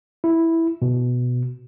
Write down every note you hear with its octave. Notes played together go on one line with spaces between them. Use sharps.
E4
B2